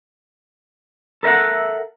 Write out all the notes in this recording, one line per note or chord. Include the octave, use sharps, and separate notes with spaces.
A4 A#4 D#5 E5 F#5